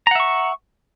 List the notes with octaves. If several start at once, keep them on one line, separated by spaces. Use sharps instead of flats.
E5 F#5 A#5 C#6